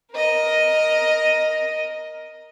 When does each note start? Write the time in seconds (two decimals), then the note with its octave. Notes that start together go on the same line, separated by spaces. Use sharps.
0.13 A#4 D#5